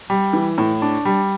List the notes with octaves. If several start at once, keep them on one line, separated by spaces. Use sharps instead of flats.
G3
E3
A2
D4
G3